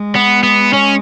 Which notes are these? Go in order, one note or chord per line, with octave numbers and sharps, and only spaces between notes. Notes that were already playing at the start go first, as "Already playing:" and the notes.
Already playing: G#3
B3
B3
C#4